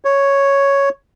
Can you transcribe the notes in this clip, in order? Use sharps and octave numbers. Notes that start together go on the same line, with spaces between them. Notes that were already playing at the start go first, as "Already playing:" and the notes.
C#5